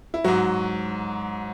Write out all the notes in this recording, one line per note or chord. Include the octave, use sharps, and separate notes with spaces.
E4
G#2 F#3 F#4